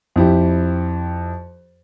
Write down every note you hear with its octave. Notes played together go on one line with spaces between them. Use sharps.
F2 E4 G4